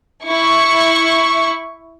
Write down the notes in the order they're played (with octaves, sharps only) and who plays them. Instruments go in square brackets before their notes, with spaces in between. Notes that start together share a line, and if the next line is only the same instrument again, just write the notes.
[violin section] E4 C#6